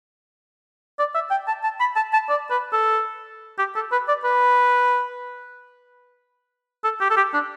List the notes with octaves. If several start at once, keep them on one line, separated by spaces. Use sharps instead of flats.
D5
E5
G5
A5
A5
B5
A5
A5
D5
B4
A4
G4
A4
B4
D5
B4
A4
G4
A4
G4
D4